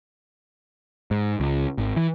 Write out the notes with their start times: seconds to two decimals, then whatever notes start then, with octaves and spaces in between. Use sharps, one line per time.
1.11 G#2
1.40 C#2
1.78 G#1
1.96 E3